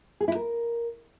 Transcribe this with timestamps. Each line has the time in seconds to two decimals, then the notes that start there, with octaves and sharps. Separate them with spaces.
0.20 G#4
0.28 E4
0.35 A#4